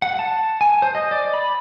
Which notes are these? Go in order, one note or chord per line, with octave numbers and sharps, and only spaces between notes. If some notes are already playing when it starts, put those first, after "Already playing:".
F#5
A5
G#5
C5
D#5
D5
B5